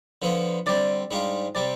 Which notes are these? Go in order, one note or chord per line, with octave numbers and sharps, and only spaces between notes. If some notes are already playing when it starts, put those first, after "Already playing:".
D3 F3 B3 F4
D3 G3 C4 D5
G#2 G3 D4 F4
C3 G3 C4 D5